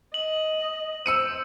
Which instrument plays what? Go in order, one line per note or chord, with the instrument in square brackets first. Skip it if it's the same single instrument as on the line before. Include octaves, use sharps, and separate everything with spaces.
[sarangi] D#5 [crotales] F#7
[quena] C5 [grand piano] E6 C#7 D#7